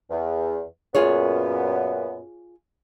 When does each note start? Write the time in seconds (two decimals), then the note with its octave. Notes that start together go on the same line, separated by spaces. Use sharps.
0.11 E2
0.95 F#2 A#2 B3 F4 G#4 C#5